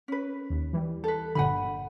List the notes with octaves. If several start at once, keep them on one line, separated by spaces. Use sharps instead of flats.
C#4 B4
D#2
E3 G3
A4 B4
G1 A#2 D3 F#5 G#5 B5